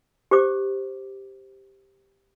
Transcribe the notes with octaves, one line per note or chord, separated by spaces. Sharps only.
G4 C5 D6